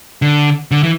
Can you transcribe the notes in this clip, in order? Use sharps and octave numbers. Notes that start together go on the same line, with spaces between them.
D3
D3
E3